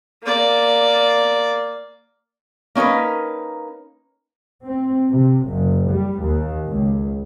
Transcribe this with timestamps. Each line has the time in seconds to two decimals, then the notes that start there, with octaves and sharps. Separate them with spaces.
0.23 A#3 D5
2.75 A#3 C#4 D#4 A#4 B4
4.63 C4
5.10 C3
5.46 F#1
5.90 G3
6.21 D#2
6.67 C#2